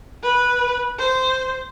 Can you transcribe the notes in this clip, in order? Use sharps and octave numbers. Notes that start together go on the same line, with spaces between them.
B4
C5